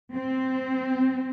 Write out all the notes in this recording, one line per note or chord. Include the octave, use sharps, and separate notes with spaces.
C4